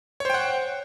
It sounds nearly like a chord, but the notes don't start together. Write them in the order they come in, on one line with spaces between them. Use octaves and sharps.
C#5 C5 G5 F#5